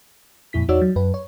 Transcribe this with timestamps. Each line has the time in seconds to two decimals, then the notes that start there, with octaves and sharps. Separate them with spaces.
0.53 F2 A#2 E4 B6
0.68 E2 D#4 F#4 C#5 D5 E6
0.81 F#3
0.96 F#2 B4
1.14 C#5